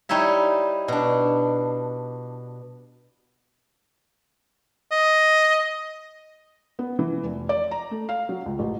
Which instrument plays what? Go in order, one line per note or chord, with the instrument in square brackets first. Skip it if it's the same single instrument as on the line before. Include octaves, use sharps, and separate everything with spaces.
[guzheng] G3 D#4 E4 C#5 E5
B2 D4
[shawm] D#5
[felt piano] B3
E3
F1
D5
A#5
A3
F5
F#3
C#2
A1